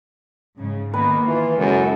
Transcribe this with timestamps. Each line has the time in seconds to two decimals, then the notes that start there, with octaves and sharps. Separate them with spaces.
0.58 G#2 C#3
0.94 D#3 A#3 B3 B4
1.26 E3 F4
1.58 F#2 C#3 G#3 A4